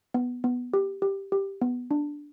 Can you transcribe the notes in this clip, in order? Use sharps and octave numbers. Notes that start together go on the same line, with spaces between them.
B3
B3
G4
G4
G4
B3
D4